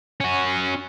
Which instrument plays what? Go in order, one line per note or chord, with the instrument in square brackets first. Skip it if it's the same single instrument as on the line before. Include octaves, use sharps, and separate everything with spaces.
[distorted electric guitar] C#4 F#4